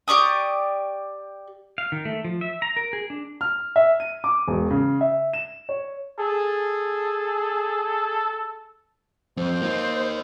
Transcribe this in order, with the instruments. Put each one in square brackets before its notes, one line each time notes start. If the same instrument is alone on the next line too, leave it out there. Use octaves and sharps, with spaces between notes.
[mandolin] G4 D5 C#6 D#6
[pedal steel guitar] F5
D#3
A3
F3
E5
A#5
A#4
G#4
D4
[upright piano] F6
E5
D#7
D6
E1
C#3
E5
E7
C#5
[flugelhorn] G#4 [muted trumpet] A4
[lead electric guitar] F2 [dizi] C5
[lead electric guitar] A#3 D#4